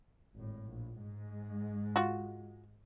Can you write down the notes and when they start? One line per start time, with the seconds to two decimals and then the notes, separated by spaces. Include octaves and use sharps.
0.34 G#1 A2
0.64 A#1
1.00 G#2 G#3
1.96 F4 F#4